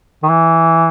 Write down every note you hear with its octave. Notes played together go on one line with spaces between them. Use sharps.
D#3
E3